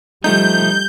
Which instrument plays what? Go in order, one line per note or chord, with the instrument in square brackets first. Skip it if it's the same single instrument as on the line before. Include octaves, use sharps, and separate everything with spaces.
[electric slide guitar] F3 A3 D#4 [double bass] G3 [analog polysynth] G6